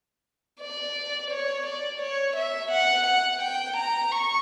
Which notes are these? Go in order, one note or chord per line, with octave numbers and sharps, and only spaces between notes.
D5
C#5
D5
C#5
E5
F#5
F#5
G5
A#5
C#6